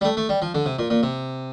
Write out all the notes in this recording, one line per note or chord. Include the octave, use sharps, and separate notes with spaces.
G3
A3
A3
G3
F3
D3
C3
A#2
A#2
C3